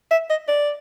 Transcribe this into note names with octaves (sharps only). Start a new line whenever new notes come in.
E5
D#5
D5